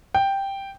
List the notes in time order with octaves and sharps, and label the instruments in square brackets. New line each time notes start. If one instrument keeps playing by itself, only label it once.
[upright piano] G5